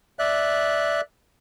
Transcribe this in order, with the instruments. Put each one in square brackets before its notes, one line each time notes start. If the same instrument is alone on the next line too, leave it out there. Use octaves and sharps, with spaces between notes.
[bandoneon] D5 E5 F#6